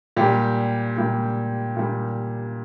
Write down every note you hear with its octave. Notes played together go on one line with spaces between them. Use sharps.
A#2 G3 G4
A#2 G3
A#2 G3